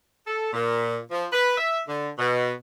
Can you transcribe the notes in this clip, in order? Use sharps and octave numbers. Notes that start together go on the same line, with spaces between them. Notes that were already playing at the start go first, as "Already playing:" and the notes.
A4
A#2
F3
B4
E5
D3
B2